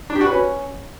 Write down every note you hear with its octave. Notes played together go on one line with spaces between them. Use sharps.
D4
G4
F#4
B4
C#4